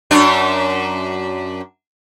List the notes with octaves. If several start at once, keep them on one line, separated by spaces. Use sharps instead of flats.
F#2 D4